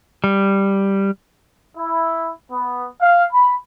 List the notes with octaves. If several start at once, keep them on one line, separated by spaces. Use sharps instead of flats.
G3
E4
B3
F5
B5